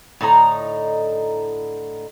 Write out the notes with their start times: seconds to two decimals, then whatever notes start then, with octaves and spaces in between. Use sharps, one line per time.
0.21 A2 D3 D#4 A#5